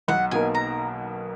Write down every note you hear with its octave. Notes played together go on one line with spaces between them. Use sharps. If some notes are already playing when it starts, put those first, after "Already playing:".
B1 F#5
B2 A#3 D#4 A#4 G#5
A#5